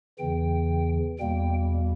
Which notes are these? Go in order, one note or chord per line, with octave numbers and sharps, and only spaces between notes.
E2 C#3 E3 G5
E2 B2 G3 A#3 G5